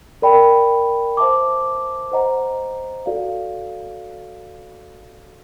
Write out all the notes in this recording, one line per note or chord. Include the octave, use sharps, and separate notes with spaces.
A#4 D5 G5 B5
C5 E5 A5 D6
C5 D#5 F#5 A#5
F#4 A4 D5 F5